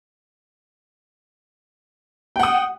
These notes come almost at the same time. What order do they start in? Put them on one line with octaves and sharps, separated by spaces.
G5 F#5 D#6